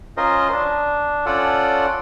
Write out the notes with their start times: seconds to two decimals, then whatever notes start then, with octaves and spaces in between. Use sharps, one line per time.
0.17 C#4 F4 A#4 C5 D#5
0.52 D4
1.26 C#4 F4 A4 D5 F#5